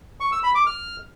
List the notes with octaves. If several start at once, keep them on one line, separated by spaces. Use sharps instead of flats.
C#6
E6
B5
D6
F6